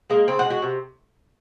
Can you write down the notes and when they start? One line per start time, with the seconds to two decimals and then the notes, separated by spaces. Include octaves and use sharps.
0.10 G#3 A#3
0.27 C#3 C4
0.39 F#4
0.45 G#3
0.50 F#4
0.62 C3